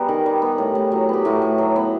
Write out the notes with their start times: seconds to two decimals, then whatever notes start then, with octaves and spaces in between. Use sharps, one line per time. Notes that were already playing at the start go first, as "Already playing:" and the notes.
Already playing: G3 B3 G#4 A#4
0.08 D#3
0.26 G3
0.42 B3
0.58 A2
0.75 A2
0.92 F#3
1.09 B3 G4
1.25 A2 E4 F#4
1.42 A2
1.58 F#3
1.76 B3